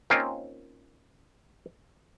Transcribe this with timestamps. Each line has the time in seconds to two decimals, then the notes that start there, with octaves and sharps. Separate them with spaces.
0.10 A#3 C4 C#4 D#4 F4 A#4